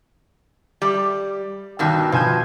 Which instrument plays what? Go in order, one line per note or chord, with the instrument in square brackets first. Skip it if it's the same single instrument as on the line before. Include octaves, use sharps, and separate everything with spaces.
[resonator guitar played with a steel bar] G3
[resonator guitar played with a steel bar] G2 B2 D#3 [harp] E6
[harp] B2 G#5 G6 [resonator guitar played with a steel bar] F3